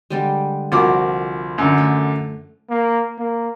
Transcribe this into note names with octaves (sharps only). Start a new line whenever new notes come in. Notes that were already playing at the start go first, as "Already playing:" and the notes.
D3 G3 G#3
C2 F3 F#4 A#4 D6
F#2 D3
A3
A#3
A#3